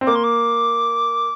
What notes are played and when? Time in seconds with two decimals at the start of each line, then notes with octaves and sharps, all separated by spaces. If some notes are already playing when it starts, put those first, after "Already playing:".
0.01 C4
0.06 A#3 D6
0.15 C6
0.23 D6